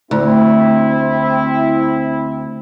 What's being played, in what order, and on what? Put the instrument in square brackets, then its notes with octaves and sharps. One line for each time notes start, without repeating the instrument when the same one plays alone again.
[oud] D2 [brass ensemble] C4 E4